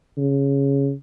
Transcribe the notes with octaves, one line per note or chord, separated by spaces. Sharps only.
C#3